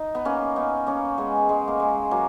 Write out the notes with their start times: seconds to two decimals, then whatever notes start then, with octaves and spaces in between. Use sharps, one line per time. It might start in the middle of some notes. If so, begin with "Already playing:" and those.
Already playing: D#4
0.15 B3
0.25 A#3 C#4
0.56 B3 D#4
0.87 A#3 C#4
1.18 G#3 B3
1.49 G#3
1.68 A#3
1.80 G#3
2.11 F#3 A#3